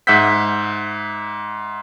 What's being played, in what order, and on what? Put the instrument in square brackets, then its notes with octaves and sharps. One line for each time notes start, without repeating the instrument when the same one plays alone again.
[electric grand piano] G#2 E5 F#5 E6 G6 B6